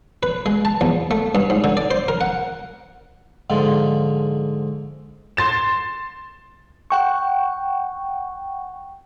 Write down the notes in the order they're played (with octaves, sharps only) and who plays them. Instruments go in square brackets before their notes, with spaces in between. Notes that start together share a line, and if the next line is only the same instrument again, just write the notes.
[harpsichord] B4
G#3
A5
E2
A3
G2
G#2
D3
D5
C5
A#4
F#5
G#2 D3 F3
[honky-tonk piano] C6 A6 E7
[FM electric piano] F#5 G5 C#6